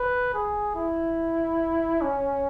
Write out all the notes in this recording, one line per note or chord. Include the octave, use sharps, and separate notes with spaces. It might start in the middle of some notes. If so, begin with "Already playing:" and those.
Already playing: B4
G#4
E4
C#4